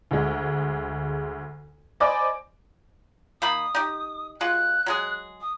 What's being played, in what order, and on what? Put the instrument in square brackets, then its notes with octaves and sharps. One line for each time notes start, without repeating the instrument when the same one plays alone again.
[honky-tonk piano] D2 G#3
C5 D5 D#5 G#5 B5 D6
[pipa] D#3 A#3 B5 [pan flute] D#6
[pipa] D#4 G4
[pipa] G#3 F4 F#4 [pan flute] F#6
[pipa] F#3 G#3 G#4
[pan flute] D#6